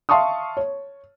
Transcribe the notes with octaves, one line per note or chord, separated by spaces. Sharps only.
E5 F5 A5 C6 C#6 D#6
C#5